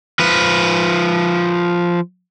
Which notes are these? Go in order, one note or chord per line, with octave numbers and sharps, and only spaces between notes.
F3 B4